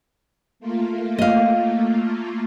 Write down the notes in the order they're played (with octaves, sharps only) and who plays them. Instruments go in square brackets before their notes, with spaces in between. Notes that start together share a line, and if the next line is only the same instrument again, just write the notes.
[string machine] A3 A#3 F4
[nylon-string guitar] D#5 F5